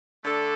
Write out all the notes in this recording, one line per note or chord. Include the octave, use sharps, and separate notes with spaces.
D3 A3 D4 A4